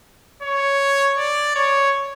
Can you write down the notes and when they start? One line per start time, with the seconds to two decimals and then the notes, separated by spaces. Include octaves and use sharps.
0.43 C#5
1.18 D5
1.56 C#5